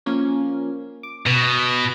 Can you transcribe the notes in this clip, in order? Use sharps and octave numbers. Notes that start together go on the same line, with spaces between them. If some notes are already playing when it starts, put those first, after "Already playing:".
F3 A#3 C#4
D6
B2 B3 B4